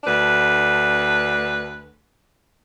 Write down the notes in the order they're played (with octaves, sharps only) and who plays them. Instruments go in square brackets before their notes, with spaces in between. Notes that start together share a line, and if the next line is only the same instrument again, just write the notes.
[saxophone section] D2 D4 B4